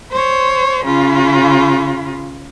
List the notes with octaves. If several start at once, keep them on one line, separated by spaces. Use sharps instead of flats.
C5 C#5
C#3 F4